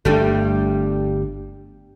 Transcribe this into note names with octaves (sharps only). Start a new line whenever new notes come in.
G1 G2 G3 A3 D4